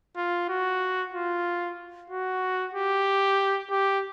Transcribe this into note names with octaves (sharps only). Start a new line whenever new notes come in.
F4
F#4
F4
F#4
G4
G4